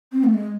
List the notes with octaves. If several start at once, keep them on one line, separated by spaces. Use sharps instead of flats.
C4
A3
G#3